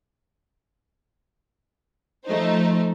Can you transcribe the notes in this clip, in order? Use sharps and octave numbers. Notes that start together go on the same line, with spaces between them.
F3 A3 D#4 C5